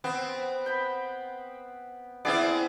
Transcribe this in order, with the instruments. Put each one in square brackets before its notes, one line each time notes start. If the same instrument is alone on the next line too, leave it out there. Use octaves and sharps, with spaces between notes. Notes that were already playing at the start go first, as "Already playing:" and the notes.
[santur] B3 [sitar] C4
[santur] G5 B5
[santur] B3 G#4 [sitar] C4 E4 D5